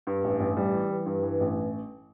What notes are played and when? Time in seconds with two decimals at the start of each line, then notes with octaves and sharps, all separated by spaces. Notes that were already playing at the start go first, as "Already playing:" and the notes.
0.07 G2
0.24 A1
0.40 A1
0.57 G3
0.73 E3
0.90 E3
1.06 G2
1.23 E3
1.40 A1